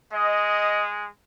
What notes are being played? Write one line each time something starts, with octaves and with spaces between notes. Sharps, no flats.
G#3 D#5